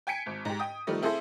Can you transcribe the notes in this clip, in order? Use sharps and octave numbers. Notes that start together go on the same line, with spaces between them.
G5 G#5 G#6 B6 C#7 D7
G#1
G#2 G4
G5 D#6
D#3 F3 G3 A3
C4 E4 G#4 A4 C5 E5